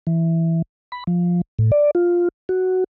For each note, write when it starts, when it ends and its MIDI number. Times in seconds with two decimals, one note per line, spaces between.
0.07 0.62 52
0.92 1.04 83
1.07 1.41 53
1.59 1.71 45
1.72 1.91 74
1.95 2.28 65
2.49 2.84 66